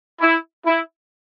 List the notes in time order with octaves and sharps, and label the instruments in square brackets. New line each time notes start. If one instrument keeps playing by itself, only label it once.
[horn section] E4
E4